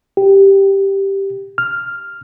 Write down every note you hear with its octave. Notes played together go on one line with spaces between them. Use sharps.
G4
F6